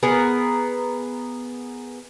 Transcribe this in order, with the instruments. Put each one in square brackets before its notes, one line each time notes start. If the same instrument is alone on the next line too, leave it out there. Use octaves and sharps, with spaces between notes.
[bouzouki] B3 G#4 A#4